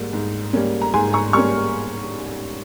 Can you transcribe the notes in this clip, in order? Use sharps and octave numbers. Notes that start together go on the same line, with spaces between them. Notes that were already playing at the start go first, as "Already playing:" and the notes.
Already playing: G#2 G3 A#3
G#2
G3 A#3 C#4
A#5
G#2 G#5 C6
A#5 C#6
G3 A#3 C#4 C#6 F6